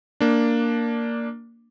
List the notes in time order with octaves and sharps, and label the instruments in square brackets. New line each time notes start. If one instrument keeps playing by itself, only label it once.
[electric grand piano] A#3 D4